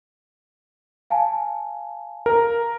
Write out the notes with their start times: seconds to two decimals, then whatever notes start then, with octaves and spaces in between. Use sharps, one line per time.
1.10 F5 G#5 A5
2.26 A#4